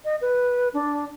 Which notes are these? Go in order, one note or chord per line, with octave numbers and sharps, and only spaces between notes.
D#5
B4
D4